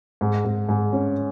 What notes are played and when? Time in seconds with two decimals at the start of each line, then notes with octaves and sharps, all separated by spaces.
0.21 G#2
0.45 G#2
0.69 G#2
0.93 C#4